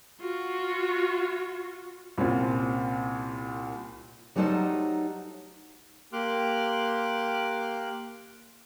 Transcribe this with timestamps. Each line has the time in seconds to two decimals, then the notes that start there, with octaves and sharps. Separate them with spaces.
0.20 F4 F#4
2.18 C2 A#2 C4 C#4 F4
4.36 F#3 G3 A3 D#4 C5 A5
6.13 A#3 G4 C6 D6 F6 F#6